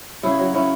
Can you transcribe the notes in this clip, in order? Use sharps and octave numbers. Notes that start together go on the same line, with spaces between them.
C#3 E4 G#4
F#3
C#3 C#4 E4